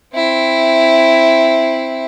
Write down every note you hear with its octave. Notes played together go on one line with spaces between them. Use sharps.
C4 E4